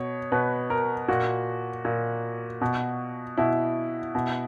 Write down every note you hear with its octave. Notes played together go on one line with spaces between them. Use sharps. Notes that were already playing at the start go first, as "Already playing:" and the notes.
Already playing: B2 C#5
B2 B4
A#4
A#2 F#4
A#2
B2
B2 E4
B2